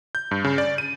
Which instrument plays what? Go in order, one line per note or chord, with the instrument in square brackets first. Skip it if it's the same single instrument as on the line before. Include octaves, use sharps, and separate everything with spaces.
[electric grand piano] G6
G2
C#3
D5
D#7